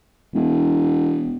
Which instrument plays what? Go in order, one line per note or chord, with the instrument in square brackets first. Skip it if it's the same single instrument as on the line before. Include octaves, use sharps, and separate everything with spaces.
[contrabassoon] E1